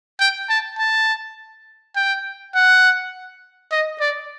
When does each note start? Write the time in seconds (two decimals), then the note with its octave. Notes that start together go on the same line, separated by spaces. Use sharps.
0.20 G5
0.50 A5
0.79 A5
1.96 G5
2.55 F#5
3.72 D#5
4.01 D5